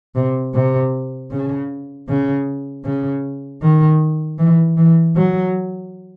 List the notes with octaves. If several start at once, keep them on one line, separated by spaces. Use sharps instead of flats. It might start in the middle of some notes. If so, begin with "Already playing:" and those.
C3
C3
C#3
C#3
C#3
D#3
E3
E3
F#3